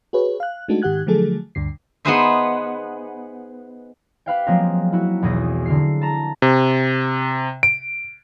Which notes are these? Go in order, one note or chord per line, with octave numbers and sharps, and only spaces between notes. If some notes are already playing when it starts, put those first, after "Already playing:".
F#4 G#4 B4 C#5
F5 F#6
G#3 A3 D4 D#4 F#4 A4
G#2 D#3 G4 F#5 F#6 G#6
D3 F3 F#3 A3 G#4 A4
D2 G2 D3 C7
B3 D#4 G#4 B4 C5 E5
G4 B4 F5 G5
F3 F#3 G#3 A#3 C4 A#4
E4 F#4
B1 E2 B2 G#4 A#6
D3 A#4 C7
A5 A#5
C3
D7